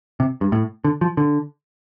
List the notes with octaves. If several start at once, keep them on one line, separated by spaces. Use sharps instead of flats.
C3
G2
A2
D3
F3
D3